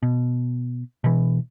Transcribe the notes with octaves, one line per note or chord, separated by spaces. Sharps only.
B2
B2 E3